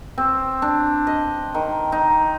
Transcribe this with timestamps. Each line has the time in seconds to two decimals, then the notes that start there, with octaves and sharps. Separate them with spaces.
0.18 C4
0.62 D4
1.07 D#5
1.54 D#3
1.92 D#4